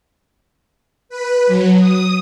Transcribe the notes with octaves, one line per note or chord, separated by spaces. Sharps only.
B4
F#3
D#6